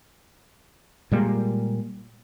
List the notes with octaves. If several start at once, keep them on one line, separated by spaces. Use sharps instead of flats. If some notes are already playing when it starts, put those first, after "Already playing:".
A#2 G3 G#3 A#3